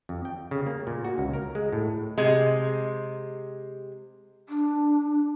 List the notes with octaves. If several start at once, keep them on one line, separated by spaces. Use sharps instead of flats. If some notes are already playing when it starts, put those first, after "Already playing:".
F2
G5
C#3
A#3
A#2
F#4
C#2
A#4
G#3
A2
C3 G#3
D4